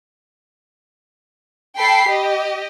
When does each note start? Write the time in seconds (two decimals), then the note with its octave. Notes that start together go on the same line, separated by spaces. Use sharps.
1.77 A4 G5 B5 C7
2.09 G4 D#5